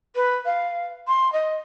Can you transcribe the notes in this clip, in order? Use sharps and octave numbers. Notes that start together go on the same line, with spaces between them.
B4
F5
C6
D#5